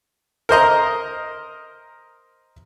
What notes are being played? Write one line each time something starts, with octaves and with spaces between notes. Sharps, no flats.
A#4 C5 D#5 A#5